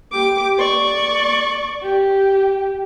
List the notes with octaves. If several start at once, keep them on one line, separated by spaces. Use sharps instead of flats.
G4 D6
D5 C#6
G4